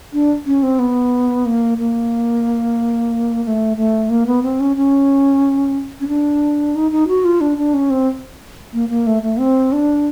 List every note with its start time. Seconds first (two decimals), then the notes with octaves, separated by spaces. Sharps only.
0.13 D4
0.46 C#4
0.63 C4
0.79 B3
1.46 A#3
1.78 A#3
3.44 A#3
3.47 A3
3.77 A3
4.10 A#3
4.27 B3
4.43 C4
4.60 C#4
4.77 C#4
6.00 C#4
6.08 D4
6.75 D#4
6.91 D#4
7.08 F#4
7.25 F4
7.41 D4
7.58 D4
7.74 C#4
7.90 C4
8.73 A#3
8.89 A#3
9.07 A3
9.23 A3
9.39 C4
9.72 D4